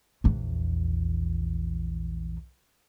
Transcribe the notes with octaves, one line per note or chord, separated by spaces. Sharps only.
A#1 E2